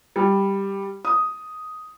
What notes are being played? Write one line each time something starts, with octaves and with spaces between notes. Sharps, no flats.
G3
D#6